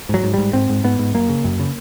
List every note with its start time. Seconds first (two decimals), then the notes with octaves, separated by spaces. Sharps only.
0.09 G#2 F#3
0.23 G#2
0.34 G#2 G3
0.53 G#2 C4
0.69 G#2
0.84 G#2 B3
0.99 G#2
1.14 F#2 A#3
1.29 C#3
1.44 F#2
1.59 C#3